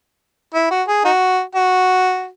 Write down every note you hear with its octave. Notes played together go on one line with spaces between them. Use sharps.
E4
F#4
G#4
D#4 F#4
F#4